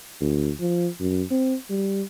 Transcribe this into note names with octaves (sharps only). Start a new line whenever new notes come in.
D2
F3
F#2
C4
G3